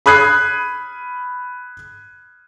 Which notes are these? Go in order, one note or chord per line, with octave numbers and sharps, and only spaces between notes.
B5 D#6 F#6 G#6 C7